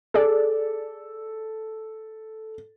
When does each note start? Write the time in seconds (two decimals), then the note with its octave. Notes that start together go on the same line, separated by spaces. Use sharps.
0.14 G#4 A4 D5